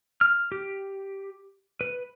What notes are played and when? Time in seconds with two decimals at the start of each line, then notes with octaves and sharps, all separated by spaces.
0.21 F6
0.52 G4
1.81 B4